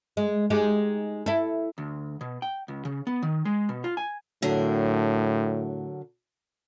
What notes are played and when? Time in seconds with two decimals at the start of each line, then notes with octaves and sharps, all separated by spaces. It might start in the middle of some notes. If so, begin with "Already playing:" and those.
0.17 G#3
0.50 G#3 D#4 G4
1.26 E4 A4
1.78 D2
2.21 B2
2.42 G5
2.68 C#2
2.85 C#3
3.07 B3
3.23 D#3
3.45 G#3
3.69 B2
3.84 F4
3.97 G#5
4.42 A2 D3 F#3 A#4